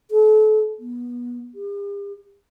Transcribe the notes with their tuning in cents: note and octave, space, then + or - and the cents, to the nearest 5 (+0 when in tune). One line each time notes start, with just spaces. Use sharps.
A4 -35
B3 -25
G4 +45